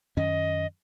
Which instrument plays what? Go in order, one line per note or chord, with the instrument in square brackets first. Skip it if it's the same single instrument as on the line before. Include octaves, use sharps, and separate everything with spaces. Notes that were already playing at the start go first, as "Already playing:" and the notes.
[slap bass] F#2 D#3 C#4 [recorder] D#5